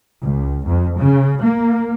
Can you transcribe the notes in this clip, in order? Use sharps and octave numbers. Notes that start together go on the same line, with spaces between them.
C#2
F2
C#3
A#3